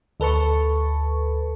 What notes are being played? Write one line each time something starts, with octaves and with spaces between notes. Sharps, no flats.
D2 A4 B4 A5 C#6